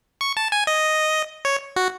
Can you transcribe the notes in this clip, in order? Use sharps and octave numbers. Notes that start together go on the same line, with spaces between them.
C#6
A5
G#5
D#5
C#5
F#4